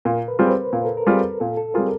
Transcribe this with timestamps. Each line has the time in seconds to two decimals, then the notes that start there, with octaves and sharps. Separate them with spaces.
0.05 A#2 A#4
0.28 B4
0.39 G3 C4 F4 G#4 B4
0.50 C5
0.73 A#2 A#4
0.85 A4
0.97 A#4
1.07 G3 C4 F4 G#4
1.40 A#2 A4
1.57 A4
1.74 G3 C4 F4 G#4 A#4